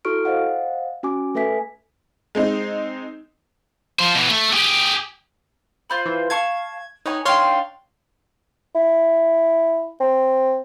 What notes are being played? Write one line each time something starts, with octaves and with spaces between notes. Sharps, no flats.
E4 F#4 A4 C#6 F6 D7
C5 D#5 F5 F#5
C#4 F#4 G#5 D6
A3 A4 B4 E5 G#5 B6
G#3 C4 D#4
F3 C5
B2 E3
A3
G4 G#4
F4 C5 B5
E3
F5 A5 C#6 G#6
D#4 B4 C#5 G#5
D4 D#4 C#5 F5 G5 C6
E4
C4